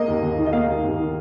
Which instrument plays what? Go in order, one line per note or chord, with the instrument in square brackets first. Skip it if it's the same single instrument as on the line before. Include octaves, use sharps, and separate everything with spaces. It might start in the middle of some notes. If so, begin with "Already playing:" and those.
Already playing: [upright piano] A#3 D#5
D#2
D#2
D#3
D#5
A#3 F5
D#2
D#2
D#3